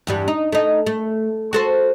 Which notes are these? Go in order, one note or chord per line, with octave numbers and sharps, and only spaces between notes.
E2 G2 G3
D#4
A3 D#4
A3
F#4 A4 C5